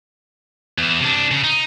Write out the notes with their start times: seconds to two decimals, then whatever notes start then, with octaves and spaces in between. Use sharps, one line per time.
0.78 E2 E3
1.00 C3 D4
1.31 C#3
1.44 D#4